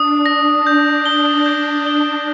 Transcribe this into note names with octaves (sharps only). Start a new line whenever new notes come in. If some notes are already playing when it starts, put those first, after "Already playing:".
Already playing: D4 D#6
A#6
G6
G7
G6
G7